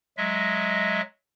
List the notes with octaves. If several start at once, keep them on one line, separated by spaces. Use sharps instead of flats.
F#3 G#3 D#5 E5